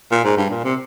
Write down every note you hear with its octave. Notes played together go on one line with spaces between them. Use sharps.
A#2
G#2
G2
A#2
C3